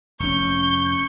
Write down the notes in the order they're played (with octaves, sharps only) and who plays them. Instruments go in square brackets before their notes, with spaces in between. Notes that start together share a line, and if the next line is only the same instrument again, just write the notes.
[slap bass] F1 C#4 [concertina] C#6 [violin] G6